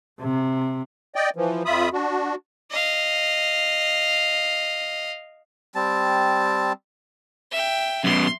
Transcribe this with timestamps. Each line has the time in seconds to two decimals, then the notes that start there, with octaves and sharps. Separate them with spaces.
0.21 C3
1.15 D5 D#5 G5
1.36 E3 F3
1.65 F2 F4 E5 B5 D#6
1.93 D4 F#4
2.70 D#5 F5
5.75 G3 C4 A5
7.52 E5 G5
8.04 F#2 B2 C6